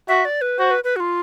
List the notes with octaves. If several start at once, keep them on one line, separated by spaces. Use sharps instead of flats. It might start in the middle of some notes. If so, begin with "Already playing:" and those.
F#4 E5
D5
B4
F#4 C5
B4
B4
F#4
F4